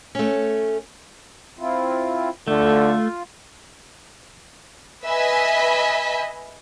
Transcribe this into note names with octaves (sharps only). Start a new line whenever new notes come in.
A3 C#4
C4 E4 F4
D3 A3 F4
B4 D#5 E5 G#5 B5 B6